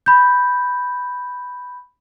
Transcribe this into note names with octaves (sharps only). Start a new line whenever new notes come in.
B5 G6